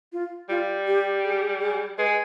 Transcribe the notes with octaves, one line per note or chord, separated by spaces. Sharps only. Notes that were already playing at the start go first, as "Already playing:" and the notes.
F4
G3 F4
G4
G#4
G4
G#4
G#4
G#3 B4